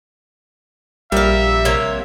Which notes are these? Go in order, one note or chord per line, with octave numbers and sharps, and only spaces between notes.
A#1 G3 A#4 E5 F5
C3 A#3 C#5